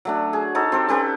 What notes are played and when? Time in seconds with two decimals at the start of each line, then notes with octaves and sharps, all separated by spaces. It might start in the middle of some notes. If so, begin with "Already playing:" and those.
0.05 F#3 A3 D4
0.33 G#4
0.55 D#4 F#4 A4 C#5
0.72 C4 G4 A4
0.88 C#4 G4 A4 B4